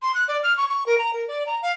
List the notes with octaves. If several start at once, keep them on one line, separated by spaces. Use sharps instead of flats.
C6
F#6
D5
F6
C#6
C#6
A#4
A#5
A#4
D5
A#5
F5